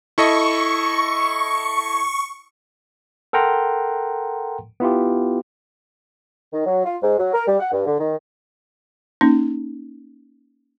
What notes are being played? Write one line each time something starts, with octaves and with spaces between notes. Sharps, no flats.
E4 A4 D#5 C#6
A4 A#4 F#5 G5 A#5 C6
B3 E4 F4 G4
D#3
F#3
F4
G#2
F#3
A#4
G3
F#5
G2
D3
D#3
A#3 C#4 D#4